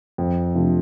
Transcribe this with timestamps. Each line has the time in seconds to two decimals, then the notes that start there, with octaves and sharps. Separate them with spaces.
0.18 F2
0.54 C3 F3 A3 D4